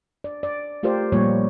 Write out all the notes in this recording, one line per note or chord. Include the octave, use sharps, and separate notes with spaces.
D5
D5
A3 F4 G4 A#4 C5 D5
A#2 F3 G3 A#3 C#5